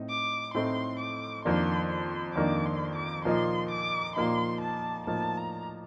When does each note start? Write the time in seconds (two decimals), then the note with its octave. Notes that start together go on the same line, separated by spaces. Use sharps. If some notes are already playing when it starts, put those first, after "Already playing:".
Already playing: A2 C4 D#4
0.09 D6
0.54 A2 A3 C4 D#4 C6
1.00 D6
1.45 F2 D#3 A#3 D4 C6
1.90 C6
2.35 F2 D#3 A#3 D4 D6
2.65 C6
2.95 D6
3.25 A#2 F3 A#3 D#4 C6
3.71 D6
4.16 A#2 F3 A#3 D#4 C6
4.61 A5
5.07 A2 F3 A#3 D#4 A5
5.37 A#5